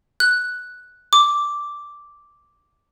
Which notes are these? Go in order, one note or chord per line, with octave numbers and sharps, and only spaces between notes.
F#6
D6